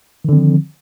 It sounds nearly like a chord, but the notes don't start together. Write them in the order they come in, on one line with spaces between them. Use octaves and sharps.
D#3 D3 C4 F3